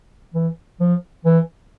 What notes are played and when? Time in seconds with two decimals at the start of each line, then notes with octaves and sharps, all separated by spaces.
0.34 E3
0.80 F3
1.25 E3